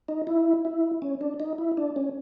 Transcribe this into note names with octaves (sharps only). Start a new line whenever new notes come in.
D#4
E4
E4
C#4
D4
D#4
E4
D4
C#4